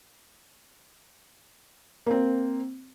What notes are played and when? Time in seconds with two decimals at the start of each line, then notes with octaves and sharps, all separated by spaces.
2.06 A#3 C4